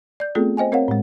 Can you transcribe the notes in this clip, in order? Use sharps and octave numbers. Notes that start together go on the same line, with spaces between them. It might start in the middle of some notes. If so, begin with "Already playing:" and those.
D5 G6
A3 B3 C4 F4 G#4 A4
C5 D#5 G5 G#5
C4 A#4 C#5 F5 F#5
A2 G#3